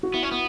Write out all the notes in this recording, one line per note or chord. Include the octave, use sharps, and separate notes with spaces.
F#4
B3 E4
C#4
B3